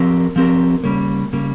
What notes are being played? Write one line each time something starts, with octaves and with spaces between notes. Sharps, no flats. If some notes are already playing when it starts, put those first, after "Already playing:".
Already playing: F3 C4 G4 A#4
F3 C4 G4 A#4
C#3 G3 A#3
C#3 G3 A#3